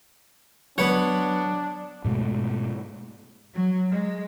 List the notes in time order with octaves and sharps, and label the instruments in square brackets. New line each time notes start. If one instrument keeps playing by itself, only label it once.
[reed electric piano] F#3 [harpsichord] B3 B4 F#5 [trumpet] D4 [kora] C#5
[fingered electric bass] G#2 B2 G#3 A3
[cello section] F#3
G#3